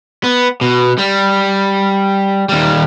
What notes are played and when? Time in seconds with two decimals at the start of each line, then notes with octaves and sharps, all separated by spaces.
0.24 B3
0.61 B2
0.98 G3
2.49 D#2 G3